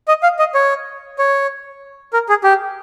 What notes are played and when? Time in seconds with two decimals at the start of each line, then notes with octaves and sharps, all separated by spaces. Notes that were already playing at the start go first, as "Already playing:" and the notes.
0.08 D#5
0.23 F5
0.39 D#5
0.55 C#5
1.18 C#5
2.13 A#4
2.29 G#4
2.44 G4